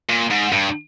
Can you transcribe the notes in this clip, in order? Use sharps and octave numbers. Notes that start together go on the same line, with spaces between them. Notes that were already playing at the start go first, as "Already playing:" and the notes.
A#2
G#2
G2